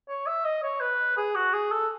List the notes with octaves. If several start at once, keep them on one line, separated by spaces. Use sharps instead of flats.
C#5
E5
D#5
C#5
B4
G#4
F#4
G#4
A4